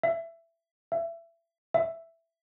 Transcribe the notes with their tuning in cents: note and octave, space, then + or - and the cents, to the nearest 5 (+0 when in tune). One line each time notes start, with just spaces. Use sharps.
E5 +15
E5 +25
E5 +5